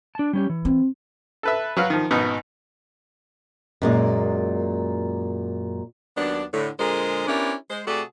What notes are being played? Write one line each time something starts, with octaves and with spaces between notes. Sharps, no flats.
D4 A5
G3 C#4 G4
E3
C4
A4 B4 E5
F#3 F#4 B4 F5
D#3 F3
G#1 B2 B3 D#4
F#2 A#2 G#3
D#2 F#3 B3 D4
A2 D3
A#2 D3 G#3 G#4 A#4 C5
B3 C#4 D4 E4 G4 A#4
G#3 C5
C3 A3 F#4 G#4 A4 D5